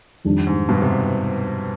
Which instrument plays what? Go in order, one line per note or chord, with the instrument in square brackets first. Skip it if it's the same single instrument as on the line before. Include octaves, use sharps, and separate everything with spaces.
[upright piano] F2 D#3 G3 D4
[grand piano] G#2
G2 B2
C3